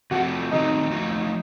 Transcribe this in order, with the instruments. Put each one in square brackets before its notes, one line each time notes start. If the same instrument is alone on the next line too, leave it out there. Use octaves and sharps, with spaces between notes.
[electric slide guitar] C3 F3 A3 [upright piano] F#4
[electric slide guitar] D#3 A3 C4 F#4 [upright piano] D#4
[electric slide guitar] F3 A3 D#4 F#4